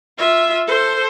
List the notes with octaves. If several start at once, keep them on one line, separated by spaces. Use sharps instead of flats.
F4 E5
A4 C5